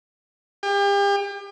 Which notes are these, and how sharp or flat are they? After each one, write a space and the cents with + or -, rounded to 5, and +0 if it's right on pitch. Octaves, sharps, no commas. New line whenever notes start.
G4 +40